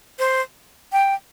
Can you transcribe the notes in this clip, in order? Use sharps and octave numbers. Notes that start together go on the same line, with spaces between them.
C5
G5